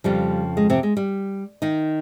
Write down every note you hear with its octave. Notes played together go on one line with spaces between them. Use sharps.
F2 C#3 F3 G3
G#3
C3 C4
G#3
G3
D#3 D#4